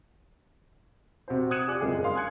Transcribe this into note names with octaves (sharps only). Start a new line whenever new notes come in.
C3 F#4 C5
D#6 F#6 G#6 C#7 D#7 E7
F4 G4 D5 G#5 D6 F#6
F#1 G#3 C4 G#4
F#1 G2 F5 C6 D#6
G#5 F#6 G#6 C#7